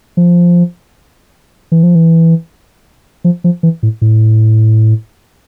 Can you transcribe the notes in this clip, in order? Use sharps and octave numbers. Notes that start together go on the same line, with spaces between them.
F3
E3
F3
E3
F3
F3
E3
A2
A2